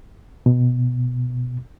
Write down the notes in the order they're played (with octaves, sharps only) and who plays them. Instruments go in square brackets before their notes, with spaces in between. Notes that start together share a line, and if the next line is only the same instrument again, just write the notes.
[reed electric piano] B2